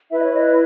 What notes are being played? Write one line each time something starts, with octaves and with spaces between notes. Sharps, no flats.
E4 B4 E5
D#5
C#5
D#5